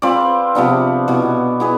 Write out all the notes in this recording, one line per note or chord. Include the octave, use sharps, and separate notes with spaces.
C4 F4 B4 D5
C3 F3 B3 D4
B2 B3 E4
B3 E4 G#4 B4